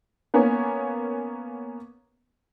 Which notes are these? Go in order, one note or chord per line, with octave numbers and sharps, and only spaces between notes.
A#3 B3 C#4